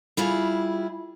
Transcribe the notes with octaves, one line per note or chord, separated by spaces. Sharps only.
G3 E4 F4 G#4